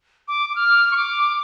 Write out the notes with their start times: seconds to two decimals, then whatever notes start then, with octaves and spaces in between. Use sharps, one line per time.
0.28 D6
0.49 D6
0.55 F6
0.92 C#6
0.96 D6